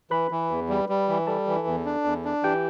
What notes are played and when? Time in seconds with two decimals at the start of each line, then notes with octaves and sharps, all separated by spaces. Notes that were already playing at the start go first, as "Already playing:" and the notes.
0.11 E3 B4 B5
0.31 E3
0.51 E2
0.69 G3
0.89 G3
1.08 E3
1.27 G3 A4 A5
1.47 E3
1.67 E2
1.85 D4
2.04 E2
2.25 D4
2.43 E3 G4 G5